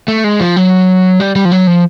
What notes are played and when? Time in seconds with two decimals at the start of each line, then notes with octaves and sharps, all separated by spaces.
0.08 A3
0.24 G#3
0.40 F3
0.56 F#3
1.20 G3
1.36 G3
1.45 F3
1.52 F#3
1.67 F3